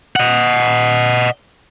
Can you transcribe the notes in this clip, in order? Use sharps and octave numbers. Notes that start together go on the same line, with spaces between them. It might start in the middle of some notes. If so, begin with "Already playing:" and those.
D#5 F#5